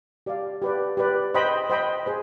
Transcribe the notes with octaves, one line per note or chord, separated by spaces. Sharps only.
G4 D5 F5
G4 B4 D5
G4 B4 D5
C5 D#5 G5 B5
C5 D#5 G5 B5
G#4 C5